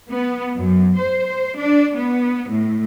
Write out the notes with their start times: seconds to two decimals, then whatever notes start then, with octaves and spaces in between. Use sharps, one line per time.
0.10 B3
0.56 F#2
0.97 C5
1.57 D4
1.96 B3
2.48 A2